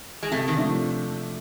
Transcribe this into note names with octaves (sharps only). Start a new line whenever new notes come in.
G#3
C3 A3
D#3
F3 A3 D4